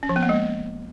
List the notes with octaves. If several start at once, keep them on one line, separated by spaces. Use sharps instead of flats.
C#4
F3
B3
A#3
G#3